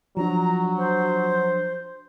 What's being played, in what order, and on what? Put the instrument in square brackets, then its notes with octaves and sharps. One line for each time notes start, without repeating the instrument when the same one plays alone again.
[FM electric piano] F3 D4 [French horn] F#3 [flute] A#5
[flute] C5